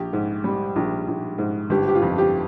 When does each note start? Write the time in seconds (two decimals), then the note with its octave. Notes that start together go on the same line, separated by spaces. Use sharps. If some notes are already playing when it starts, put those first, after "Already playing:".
Already playing: A#1 G4
0.13 G#2
0.44 G3
0.76 A#1
1.08 A#1
1.38 G#2
1.70 G1 G4
1.88 G4
1.95 F4
2.02 F2
2.18 G4